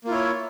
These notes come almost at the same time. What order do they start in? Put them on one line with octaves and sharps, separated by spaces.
A#3 F4 E4 C#5